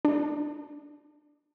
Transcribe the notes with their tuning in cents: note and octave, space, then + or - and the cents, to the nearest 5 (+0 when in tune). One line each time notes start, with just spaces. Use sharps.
D4 +5